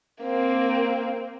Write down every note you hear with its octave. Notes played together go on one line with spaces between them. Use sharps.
A#3 C4